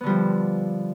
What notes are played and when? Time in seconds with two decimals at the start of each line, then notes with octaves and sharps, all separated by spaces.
0.01 B3
0.04 D3
0.06 G3
0.09 F3